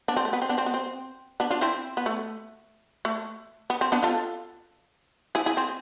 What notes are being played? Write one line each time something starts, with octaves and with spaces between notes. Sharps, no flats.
B3 D4
C4
A3
B3
C4
B3 D4
C4
B3
C4
B3 D4
D4 F4
C4 E4
B3
A3
A3
B3
C4
B3 D4
F4 A4
E4 G#4
E4 G#4
C4